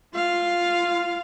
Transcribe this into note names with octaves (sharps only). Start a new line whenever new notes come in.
F4 F5